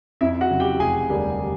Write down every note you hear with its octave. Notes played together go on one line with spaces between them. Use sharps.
F2 E4 E5
F#4 F#5
C#3 F#3
G4 G5
F1 G#4 G#5
D#2 D3 G3 A#3